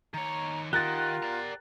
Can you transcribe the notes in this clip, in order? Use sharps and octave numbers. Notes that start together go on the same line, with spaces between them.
D#3 C#5 A#5
D#3 D#4 F4 G4 A#4 F#5 F#6 A6
D5 A#5